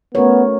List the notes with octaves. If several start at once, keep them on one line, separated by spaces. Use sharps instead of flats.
A3 B3 C#4 F#4 A#4 C#5